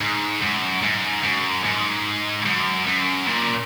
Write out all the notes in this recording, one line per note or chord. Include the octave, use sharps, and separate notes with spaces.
G#2
F#2
G#2
F#2
G#2
F#2
F#2
A#2